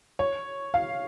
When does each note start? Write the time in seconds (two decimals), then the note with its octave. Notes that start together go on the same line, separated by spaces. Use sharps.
0.19 C#5
0.74 F5